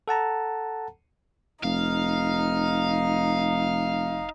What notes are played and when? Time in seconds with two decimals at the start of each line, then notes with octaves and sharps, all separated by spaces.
0.08 A4 F#5 A5 A#5
1.64 F1 D#4 F5